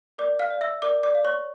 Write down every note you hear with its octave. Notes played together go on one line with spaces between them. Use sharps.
A#4 D5 D6
F5 F6
D5 F5
E5 E6
A#4 D5 D6
D5 D6
D5 F5
C#5 C#6